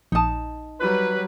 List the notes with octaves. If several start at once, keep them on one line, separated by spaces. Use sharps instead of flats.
A#1 D#4 A5 D#6
F#3 G3 B4